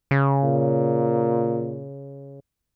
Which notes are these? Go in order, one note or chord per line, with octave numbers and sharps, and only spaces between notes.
C#3
A#2